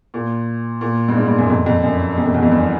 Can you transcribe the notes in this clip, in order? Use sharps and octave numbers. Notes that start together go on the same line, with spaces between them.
A#2
A#2
G2
G#2
G2
F#2
F2
F2
F#2
F#2
F2
E2
F2
G2